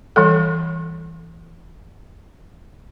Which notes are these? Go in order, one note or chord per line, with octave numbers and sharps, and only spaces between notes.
E3 G3 A4